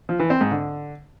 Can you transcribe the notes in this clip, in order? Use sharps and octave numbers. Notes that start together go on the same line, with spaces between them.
F3
E3
C4
G#2
D3